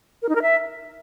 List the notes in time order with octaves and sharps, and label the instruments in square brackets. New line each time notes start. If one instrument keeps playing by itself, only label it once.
[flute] A#4
D#4
A#4
E5